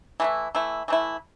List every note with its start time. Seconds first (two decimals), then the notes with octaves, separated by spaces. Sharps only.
0.20 E3 A3 E4
0.55 E3 A3 E4
0.88 E3 A3 E4